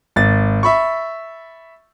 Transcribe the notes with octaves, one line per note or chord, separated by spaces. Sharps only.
G#1 A6
E5 B5 C#6